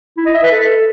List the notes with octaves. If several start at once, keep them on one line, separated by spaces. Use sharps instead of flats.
E4
D#5
E5
B4
A4